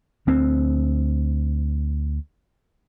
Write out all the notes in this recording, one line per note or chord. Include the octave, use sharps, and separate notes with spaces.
D2 C4